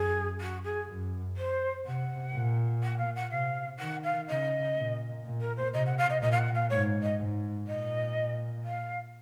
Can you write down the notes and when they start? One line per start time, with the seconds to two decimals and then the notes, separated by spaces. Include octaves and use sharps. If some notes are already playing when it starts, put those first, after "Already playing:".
Already playing: F#2 G#4
0.41 F#4
0.64 G#4
0.88 F#2
1.37 C5
1.85 C3 F#5
2.34 A#2
2.83 F#5
2.98 F5
3.15 F#5
3.31 C3 F5
3.79 D#3 F#5
4.04 F5
4.28 C#3 D#5
4.76 A#2
5.25 A#2
5.41 A#4
5.57 C5
5.73 C3 D#5
5.86 F#5
5.98 F5
6.10 D#5
6.21 A#2 D#5
6.31 F5
6.38 F#5
6.55 F5
6.70 G#2 C#5
7.03 D#5
7.19 G#2
7.67 A#2 D#5
8.64 F5